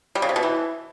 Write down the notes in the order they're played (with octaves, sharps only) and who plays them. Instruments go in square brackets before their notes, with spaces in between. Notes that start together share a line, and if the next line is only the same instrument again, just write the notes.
[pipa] G3
C#3
C3
B2
E3